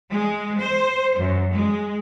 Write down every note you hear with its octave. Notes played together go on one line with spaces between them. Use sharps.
G#3
C5
F#2
G#3